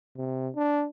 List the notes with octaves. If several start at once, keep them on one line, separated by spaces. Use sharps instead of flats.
C3
D4